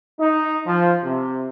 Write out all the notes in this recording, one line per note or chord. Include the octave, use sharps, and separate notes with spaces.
D#4
F3
C3